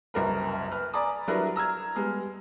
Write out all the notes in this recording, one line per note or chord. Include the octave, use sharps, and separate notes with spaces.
F#1 C2 F#2 A#4 B4
B4 F6
D5 G#5 A#5 B5 D6 D#6
F#3 G3 D4 E4 A#4 B4
A#5 E6 F6 G#6
G3 G#3 B3 F6